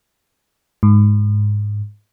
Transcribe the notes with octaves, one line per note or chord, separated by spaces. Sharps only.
G#2